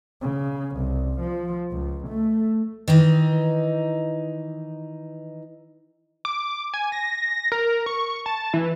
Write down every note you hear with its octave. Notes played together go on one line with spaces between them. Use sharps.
C#3
C2
F3
C#2
A3
D#3 E3 D#4
D6
G#5
A#6
A#4
C#6
A5
E3